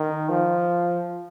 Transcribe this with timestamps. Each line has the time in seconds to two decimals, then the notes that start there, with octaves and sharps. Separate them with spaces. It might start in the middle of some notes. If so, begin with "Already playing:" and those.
Already playing: D#3
0.29 F3